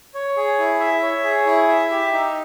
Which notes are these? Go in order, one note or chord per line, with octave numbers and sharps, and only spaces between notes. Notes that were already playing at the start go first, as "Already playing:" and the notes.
C#5
G#4
E4
E5
C#5
G#4
E4
E5
G4
D#4